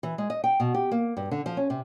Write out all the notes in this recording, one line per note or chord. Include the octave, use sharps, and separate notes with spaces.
E3
G#3
D#5
G5
B2
G4
A#3
G2
D3
F3
C#4
C3